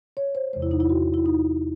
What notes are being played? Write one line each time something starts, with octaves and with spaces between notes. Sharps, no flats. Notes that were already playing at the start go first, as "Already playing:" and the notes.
C#5
C5
E2 C3 E3 G#3 C5
E4
D#4
E4
F#4
E4
D#4